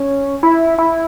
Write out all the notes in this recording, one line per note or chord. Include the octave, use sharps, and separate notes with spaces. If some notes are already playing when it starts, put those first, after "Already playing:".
Already playing: C#4
E4
E4